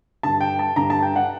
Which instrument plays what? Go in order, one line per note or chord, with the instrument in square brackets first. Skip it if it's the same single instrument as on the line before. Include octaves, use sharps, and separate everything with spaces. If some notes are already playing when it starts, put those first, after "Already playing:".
[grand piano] G2 D3 A5
G5
A5
G2 D3 A#5
A5
G5
F#5